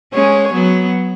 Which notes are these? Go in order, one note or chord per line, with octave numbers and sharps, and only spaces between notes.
G#3 C#4 C#5
F#3 B3